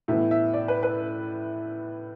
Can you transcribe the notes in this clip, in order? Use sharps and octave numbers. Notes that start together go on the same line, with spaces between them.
A2 E3 B3 E5
E5
D5
B4
B4